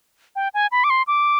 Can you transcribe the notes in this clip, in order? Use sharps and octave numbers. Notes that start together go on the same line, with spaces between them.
G5
G#5
B5
D6
C6
D6